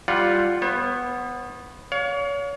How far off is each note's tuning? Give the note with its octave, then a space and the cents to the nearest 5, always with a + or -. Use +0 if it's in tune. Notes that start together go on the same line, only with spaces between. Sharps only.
G3 +0 F4 +0 F#5 +0
B3 +0 C5 +45
C#5 +35 F5 +35